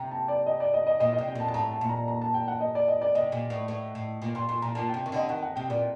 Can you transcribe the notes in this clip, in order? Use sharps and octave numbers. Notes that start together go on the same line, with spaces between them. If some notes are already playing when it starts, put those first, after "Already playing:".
Already playing: C3 A#5
A5
D5
D#5
D5
D#5
D#5
A#2 D#5
D#5
C3
G5
A#2 A5
A5
A2 A#5
A5
A#2
A#5
A#5
A5
G5
F#5
D#5
D5
D#5
D5
C3 D#5
A#2
A2
A2
A2
A#2
A#2 C6
A#2 C6
A#2 A#5
A#2 A5
G5
C3
D#3
D3 D#5
D#3 F#5
F#5
C3 G5
A#2 D5